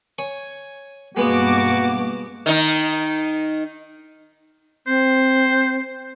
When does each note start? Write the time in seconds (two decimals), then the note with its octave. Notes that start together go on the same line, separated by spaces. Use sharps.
0.19 C#5 G#5
1.17 G2 B2 G#3 A#3 B3 F#4 D6
2.46 D#3 D#4
4.87 C4 C5